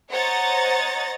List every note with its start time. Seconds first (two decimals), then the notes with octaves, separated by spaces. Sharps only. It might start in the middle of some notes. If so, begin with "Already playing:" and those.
0.11 C5 C#5 D#5 F#5 A#5 A6